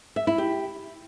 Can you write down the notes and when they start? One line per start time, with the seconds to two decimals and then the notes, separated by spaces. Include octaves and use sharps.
0.16 E5
0.27 E4
0.38 G4